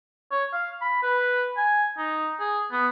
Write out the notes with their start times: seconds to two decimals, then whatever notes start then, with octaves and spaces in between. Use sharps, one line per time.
0.32 C#5
0.53 F5
0.81 B5
1.03 B4
1.57 G#5
1.98 D#4
2.40 G#4
2.72 B3